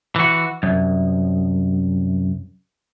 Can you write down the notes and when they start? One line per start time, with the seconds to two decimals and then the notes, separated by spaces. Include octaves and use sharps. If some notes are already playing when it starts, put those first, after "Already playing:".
0.16 E3 F#4
0.63 C2 F#2